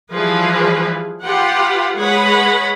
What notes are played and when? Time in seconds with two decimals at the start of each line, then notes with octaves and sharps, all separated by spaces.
0.12 E3 F3 G3 G#4 B4
1.22 F4 G4 B4 F#5
1.97 G#3 G#4 B4 C#5 F#5 B5